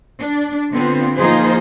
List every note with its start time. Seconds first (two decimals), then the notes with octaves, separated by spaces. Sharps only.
0.19 D4
0.72 D3 B3 C4 F4
1.16 F3 A#3 D#4 F4 G#4 C5